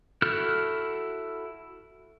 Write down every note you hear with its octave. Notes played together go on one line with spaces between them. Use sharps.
E4 F#4 A4 F6 F#6